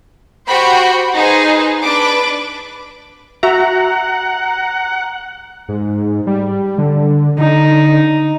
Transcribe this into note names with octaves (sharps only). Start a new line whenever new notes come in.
F#4 G4 C5 G5 B5
D#4 G#4 B4 C5
D4 B4 D6
F#4 E5 F#5 A#5
G#2
G3
D3
D3 D#4